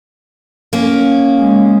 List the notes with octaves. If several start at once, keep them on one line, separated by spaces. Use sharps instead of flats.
A#3 C#4
G#3